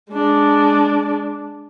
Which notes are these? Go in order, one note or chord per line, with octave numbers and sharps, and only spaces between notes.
G#3 D4